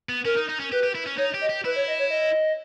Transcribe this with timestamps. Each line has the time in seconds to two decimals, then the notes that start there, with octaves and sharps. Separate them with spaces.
0.09 B3
0.25 C#4 A#4
0.37 D#4
0.49 D#4
0.60 C#4
0.72 G4 B4
0.83 G4
0.95 E4
1.06 C#4
1.18 D#4 C#5
1.34 G4
1.41 D#5
1.49 G4
1.64 E4 B4
1.76 C#5
1.88 D#5
2.00 C#5
2.11 D#5